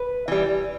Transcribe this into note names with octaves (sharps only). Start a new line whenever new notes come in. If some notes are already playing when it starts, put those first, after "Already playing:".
Already playing: B4
E3 G3